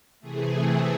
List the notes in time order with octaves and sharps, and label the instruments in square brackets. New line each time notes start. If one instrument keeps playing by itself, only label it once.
[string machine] C3 E3 A3 G#4